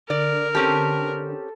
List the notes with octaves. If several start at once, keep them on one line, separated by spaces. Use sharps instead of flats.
D3 A#4 D5
C4 C#4 G4 A4